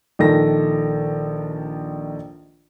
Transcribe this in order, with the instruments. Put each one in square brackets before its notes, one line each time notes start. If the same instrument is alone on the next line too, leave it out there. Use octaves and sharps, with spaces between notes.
[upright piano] A#1 D#3 A4 A#6